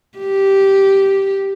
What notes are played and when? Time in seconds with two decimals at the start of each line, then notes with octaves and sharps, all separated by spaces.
0.18 G4